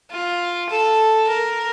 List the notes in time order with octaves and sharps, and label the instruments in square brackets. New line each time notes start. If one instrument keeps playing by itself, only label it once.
[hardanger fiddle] F4
A4
A#4